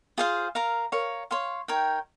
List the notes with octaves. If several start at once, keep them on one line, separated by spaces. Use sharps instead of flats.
F4 G#4 C5 F5
A#4 F5 A#5
A#4 C#5 F5
C#5 F5 C6
D#4 A#4 C#5 G5